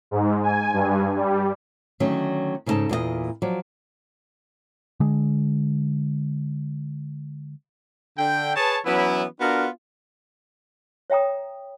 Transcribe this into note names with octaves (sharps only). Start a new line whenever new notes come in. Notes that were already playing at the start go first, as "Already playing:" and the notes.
G#2
G#5
G2
G3
D3 D#3 F#3 A3 C#4
G#2 C#3 C#4 D#4 A4 A5
E2 A#2 G4 D#5
F3 F#3 D5
D3 G#3
D3 G5
G#4 B4 C#5 A5
E3 F#3 B3 C#4 E4
B3 D4 F4 F#4 A#4
C#5 E5 G5 A#5 D#6